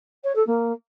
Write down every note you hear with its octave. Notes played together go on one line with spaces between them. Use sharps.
C#5
A4
A#3